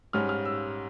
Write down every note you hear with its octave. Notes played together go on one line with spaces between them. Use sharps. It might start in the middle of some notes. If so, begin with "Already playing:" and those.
G#2 G3 C#4 F6
F6
E6